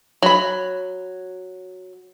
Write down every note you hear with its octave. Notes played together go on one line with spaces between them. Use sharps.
F#3 B5